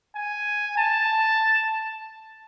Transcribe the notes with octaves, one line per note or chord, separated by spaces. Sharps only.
G#5
A5